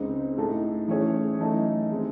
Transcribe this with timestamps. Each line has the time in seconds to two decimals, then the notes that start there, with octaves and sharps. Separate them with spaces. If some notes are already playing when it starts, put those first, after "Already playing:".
Already playing: C#2 C#3 G#3 C4 D#4
0.38 A2 G#3 D#4 A4
0.88 E3 A3 C#4 G#4 C#5
1.38 F#2 E3 A3 D#4 A4
1.91 D#3 G#3 C4